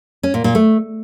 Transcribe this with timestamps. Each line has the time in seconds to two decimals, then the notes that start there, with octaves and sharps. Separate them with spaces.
0.23 C#4
0.34 A#2
0.44 A#2
0.55 A3